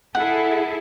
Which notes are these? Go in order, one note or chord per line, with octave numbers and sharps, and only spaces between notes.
E4 G#4 A4 F#5